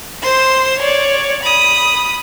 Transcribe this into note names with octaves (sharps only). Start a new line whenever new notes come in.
C5 C6
C#5 D5
B5 D#6